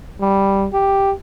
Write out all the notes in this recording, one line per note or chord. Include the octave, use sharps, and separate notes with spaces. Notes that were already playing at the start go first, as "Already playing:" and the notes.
G3
G4